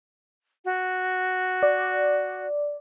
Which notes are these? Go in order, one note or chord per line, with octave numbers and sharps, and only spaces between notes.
F#4
D5